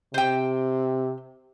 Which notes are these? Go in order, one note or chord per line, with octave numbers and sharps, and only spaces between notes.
C3 C5 G5